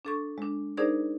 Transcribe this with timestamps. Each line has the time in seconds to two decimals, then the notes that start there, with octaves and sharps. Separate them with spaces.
0.05 D4 A4 C#6
0.38 G#3 D4
0.77 D4 D#4 G#4 A#4 C5 D5